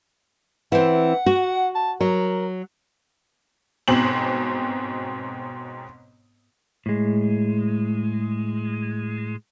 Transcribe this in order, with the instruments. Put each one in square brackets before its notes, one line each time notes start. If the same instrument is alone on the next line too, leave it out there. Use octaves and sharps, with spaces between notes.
[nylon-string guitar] E3 C4 [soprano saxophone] F#5
[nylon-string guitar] F#4
[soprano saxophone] A5
[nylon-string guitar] F#3 [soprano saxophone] A#4
[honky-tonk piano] G1 G#2 B2 C4 F#7
[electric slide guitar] A2 G#3